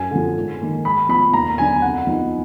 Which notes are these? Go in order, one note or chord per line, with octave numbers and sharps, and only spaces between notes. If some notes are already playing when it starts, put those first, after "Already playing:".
Already playing: F#2 G#5
D3 F3
G#2
D#3 A#3
G#2 B5
F3 B3 B5
D#2 A#5
D3 F#3 B3 D4 G#5
F2 F#5
F3 B3 D#4